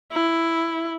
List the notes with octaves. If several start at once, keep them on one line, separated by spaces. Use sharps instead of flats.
E4